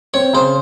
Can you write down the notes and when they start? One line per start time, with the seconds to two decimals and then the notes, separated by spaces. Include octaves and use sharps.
0.14 C4 C#5
0.33 C#3 C5